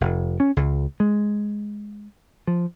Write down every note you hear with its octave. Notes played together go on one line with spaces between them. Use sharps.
F1
C#4
C#2
G#3
F3